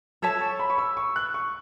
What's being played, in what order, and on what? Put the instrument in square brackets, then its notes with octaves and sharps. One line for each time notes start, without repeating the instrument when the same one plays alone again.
[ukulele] A4 C#5 E5 A5 [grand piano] E6
[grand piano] C#6
B5
C#6
E6
C#6
F#6
C#6